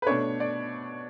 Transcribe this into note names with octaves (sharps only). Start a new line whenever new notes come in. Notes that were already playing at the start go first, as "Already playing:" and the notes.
B4
B2 A3 D4 C#5
D5